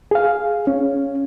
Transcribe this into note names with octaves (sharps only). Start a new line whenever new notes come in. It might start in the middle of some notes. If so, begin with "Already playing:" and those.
G#4 F5
C#4